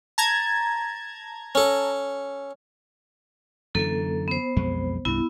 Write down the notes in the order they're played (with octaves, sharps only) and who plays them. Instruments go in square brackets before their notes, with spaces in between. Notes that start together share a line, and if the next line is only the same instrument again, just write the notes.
[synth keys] A5 A#5 G#6
[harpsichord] C#4 A4
[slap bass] F#2 D3 E3 [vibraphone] A#3 A4
[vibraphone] B3 C5
[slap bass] B1 F2 G#3
[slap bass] C2 G2 [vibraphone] B3 E4